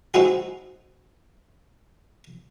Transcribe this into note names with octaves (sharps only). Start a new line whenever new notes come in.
C4 D#4 E4 F#4 G#4